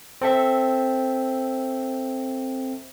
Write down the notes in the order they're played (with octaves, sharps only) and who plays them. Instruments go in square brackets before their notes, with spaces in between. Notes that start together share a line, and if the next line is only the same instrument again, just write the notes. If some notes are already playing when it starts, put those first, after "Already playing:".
[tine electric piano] C4 A4 E5